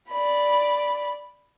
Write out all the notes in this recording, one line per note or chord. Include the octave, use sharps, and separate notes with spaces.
D5 B5